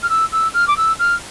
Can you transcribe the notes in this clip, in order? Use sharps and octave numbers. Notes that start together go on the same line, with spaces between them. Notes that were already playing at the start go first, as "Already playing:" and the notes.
F6
E6
E6
F6
D6
E6
F6